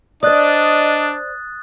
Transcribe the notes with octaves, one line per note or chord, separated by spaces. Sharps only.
D4 C5 D5 D#5 D#6 F#6 A6